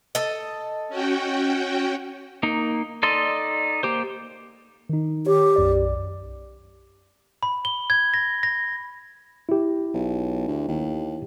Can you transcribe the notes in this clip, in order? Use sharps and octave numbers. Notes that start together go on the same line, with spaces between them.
A4 D#5
C#4 F#4 G5
A#3 D#4
D#4 A4 D5 D#5 C6
A#3 G4 C5
D#3 D#4
G4 C#5
B1 F#2 D5
B5
G7
G#6
A#6
A#6
E4 G4
B1
D2
D#2